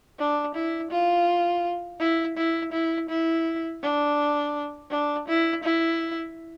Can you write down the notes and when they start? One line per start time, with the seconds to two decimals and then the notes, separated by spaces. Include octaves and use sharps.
0.19 D4
0.55 E4
0.91 F4
2.00 E4
2.37 E4
2.73 E4
3.09 E4
3.83 D4
4.91 D4
5.28 E4
5.64 E4